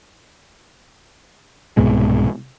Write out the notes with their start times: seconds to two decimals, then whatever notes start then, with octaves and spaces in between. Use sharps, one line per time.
1.77 C2 G#2 B2 G#3